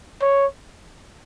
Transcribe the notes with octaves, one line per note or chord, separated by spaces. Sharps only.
C#5